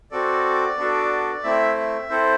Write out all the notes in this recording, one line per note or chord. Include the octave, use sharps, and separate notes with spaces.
C4 F#4 A4 D5
B3 D4 F#4 A4
A3 C4 E4 E5
E5
C4 E4 A4 C5